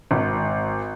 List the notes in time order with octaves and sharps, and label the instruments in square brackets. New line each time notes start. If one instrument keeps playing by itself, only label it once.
[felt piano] G#1